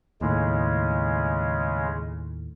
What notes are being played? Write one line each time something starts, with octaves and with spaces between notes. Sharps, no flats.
D#2 A2 C#3 G#3